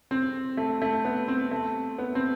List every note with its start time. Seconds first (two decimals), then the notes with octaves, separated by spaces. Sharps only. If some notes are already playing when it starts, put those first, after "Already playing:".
0.11 C4
0.57 A3
0.82 A3
1.05 B3
1.28 C4
1.51 A3
1.98 B3
2.15 C4